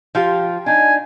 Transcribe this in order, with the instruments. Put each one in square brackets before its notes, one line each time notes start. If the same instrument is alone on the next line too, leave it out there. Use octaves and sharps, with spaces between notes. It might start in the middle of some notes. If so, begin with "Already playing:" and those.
[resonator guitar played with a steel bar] F3 F4 G4
[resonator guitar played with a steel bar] D4 D#4 [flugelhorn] G#5